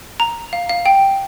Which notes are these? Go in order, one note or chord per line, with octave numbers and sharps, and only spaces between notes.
A#5
F5
F5
G5